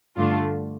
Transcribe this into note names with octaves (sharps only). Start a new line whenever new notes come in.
G2 D3 A3 D4 F4